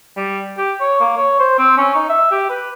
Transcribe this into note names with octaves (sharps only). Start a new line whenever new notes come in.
G3
G4
C#5
A#3
C#5
C5
C4
C#4
D#4
E5
G4
B4